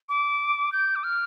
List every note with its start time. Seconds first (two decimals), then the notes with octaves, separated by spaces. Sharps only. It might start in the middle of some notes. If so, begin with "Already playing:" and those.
0.09 D6
0.72 G6
0.96 D6
1.04 F6